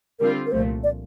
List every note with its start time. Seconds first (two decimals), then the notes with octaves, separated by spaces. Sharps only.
0.20 D3 G3 C4 F4 A#4
0.46 A#4
0.52 C2 A#2 F3 A3 C5
0.84 D5